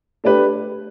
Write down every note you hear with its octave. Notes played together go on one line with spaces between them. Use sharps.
A3 D4 G4 B4